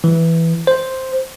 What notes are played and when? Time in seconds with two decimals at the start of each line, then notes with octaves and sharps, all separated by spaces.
0.04 E3
0.67 C5